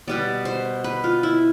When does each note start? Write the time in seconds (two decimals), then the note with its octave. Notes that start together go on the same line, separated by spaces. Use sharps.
0.08 B2 G3 B3 D5
0.45 C5
0.84 B4
1.04 F4
1.23 E4